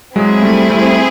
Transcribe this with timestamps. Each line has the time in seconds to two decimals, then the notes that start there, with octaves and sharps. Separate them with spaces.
0.16 F#3 G#3 C4 E4 G#4
0.42 G3 A3
0.70 G3 A3